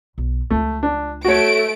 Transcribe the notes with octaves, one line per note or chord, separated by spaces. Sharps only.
B1 B2
C#2 A3 F4
D4
A3 F#4 C#5 D7